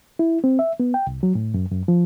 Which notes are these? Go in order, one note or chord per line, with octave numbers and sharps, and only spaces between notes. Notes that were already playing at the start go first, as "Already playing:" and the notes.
E4
C4
E5
B3
G5
C2
F#3
A2
F#2
F#2
F3